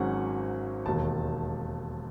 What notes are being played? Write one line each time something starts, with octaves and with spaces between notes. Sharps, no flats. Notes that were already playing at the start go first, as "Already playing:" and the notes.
Already playing: G#1 G#2 F#3 C#4 F#5
E1 D#2 D#3 A5